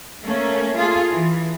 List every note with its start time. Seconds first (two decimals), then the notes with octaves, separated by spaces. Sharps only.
0.24 A3 A#3 C#4
0.77 F4 G#4 A4
1.12 E3